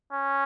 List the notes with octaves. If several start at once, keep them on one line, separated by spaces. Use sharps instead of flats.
C#4